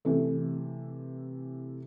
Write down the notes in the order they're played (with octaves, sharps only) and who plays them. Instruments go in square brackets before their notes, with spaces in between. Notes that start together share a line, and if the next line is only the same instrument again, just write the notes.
[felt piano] C3 E3 A3